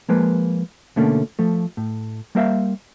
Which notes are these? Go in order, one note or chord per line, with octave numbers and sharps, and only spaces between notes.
F3 G#3 A#3 B4
B2 D3 A3 A#3 C#4
F3 A3
A2
G3 A#3 A#4 C5 E5 F5